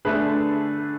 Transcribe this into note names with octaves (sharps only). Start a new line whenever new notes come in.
D3 A3 D4 G#4 B4